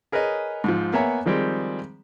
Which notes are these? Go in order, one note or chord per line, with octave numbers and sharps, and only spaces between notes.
G#4 A#4 B4 C#5 D#5
G#2 F3
A#3 B3 C#5 E5 G#5 A#5
D#3 F3 G3 G#3 C4